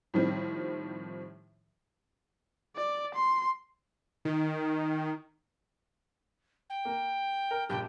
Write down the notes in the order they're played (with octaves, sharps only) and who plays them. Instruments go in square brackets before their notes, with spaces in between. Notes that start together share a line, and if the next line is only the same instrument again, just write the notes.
[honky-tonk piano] A2 D#3 F3 G3 C4
[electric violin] D5
C6
[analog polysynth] D#3
[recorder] G5
[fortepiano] A#3
A#4
[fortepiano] A#1 G2 G4 [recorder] G5